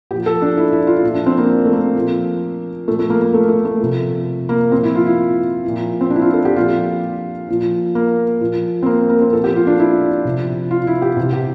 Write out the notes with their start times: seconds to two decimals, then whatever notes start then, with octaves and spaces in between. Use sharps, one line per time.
0.11 A#2 F3 G4
0.26 A4
0.42 D4
0.58 E4
0.73 E4
0.87 F4
1.03 A#2 F3
1.14 D4
1.26 C4
1.38 A#3
1.65 A3
1.73 A#3
1.95 A#2 F3
2.88 A#2 F3 A3
2.99 A3
3.10 A#3
3.22 A#3
3.34 A3
3.49 A3
3.65 A3
3.80 C3 F3
4.49 A#3
4.72 A#2 F3 C4
4.83 E4
4.95 F4
5.06 E4
5.64 A#2 F3
6.01 C4
6.10 D4
6.16 E4
6.22 F4
6.34 A4
6.45 G4
6.56 A#2 F3 F4
7.49 A#2 F3
7.95 A#3
8.41 A#2 F3
8.83 C4
8.86 A#3
9.09 A#3
9.21 C4
9.33 A#2 F3 A4
9.44 G4
9.56 F4
9.67 D4
9.80 E4
10.25 C3 F3
10.71 F4
10.87 E4
11.02 G4
11.17 C3 E3
11.33 G4